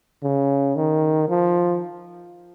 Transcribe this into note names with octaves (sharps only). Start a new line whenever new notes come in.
C#3
D#3
F3